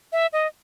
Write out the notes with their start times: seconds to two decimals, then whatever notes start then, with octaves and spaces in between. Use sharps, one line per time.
0.12 E5
0.33 D#5